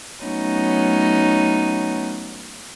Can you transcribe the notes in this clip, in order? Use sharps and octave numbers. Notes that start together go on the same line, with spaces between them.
F#3 A3 B3 C#4 D#4